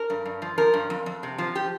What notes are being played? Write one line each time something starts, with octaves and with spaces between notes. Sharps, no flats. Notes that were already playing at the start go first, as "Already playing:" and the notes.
Already playing: A#4
G2
G2
F3
F3 A#4
G2
F2
F2
C3
F3
G4